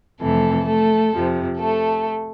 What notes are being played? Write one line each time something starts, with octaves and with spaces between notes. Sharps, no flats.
F2 C3 E3 A3 A4
A3 A4
F2 C3 F3
A3 A4